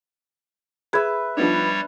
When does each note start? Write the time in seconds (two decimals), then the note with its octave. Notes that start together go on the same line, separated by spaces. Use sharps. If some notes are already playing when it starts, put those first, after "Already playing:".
0.93 G#4 B4 E5 G#6
1.37 F3 G3 B3 D4 D#4 C#5